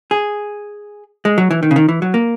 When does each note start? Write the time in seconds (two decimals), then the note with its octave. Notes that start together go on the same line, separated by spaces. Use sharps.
0.11 G#4
1.25 G#3
1.38 F#3
1.51 E3
1.63 D#3
1.71 C#3
1.76 D#3
1.89 E3
2.02 F#3
2.14 A#3